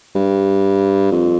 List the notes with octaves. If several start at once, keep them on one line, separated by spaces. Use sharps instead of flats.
G2
F2